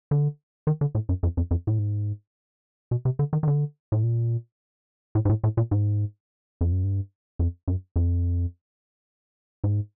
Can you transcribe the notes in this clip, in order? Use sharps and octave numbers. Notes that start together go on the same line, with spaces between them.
D3
D#3
D3
A2
F#2
F2
F2
F2
A2
G#2
B2
C3
D3
D#3
D#3
D3
A2
A#2
A2
G#2
A2
A2
A#2
G#2
F2
F#2
G2
F2
F#2
F2
G#2